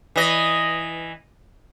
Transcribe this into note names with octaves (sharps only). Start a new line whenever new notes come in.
E3 D#5